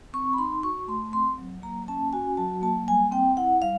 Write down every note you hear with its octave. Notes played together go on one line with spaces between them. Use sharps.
C4 C#6
B5
D#4 C6
F#4 C#6
A3 C6
C4 C6
F#3
A#3 A#5
C#4 A5
F#4 G#5
F#3 A5
A#3 A5
G3 G#5
C4 G5
E4 F#5
G3 F5